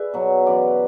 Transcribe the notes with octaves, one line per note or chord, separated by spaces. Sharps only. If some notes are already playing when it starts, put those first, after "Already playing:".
Already playing: G#4 B4 D5 E5
B2 F#3
F#2 E3 D5